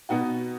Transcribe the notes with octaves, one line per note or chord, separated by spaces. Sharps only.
B2 B3 D#4 F#4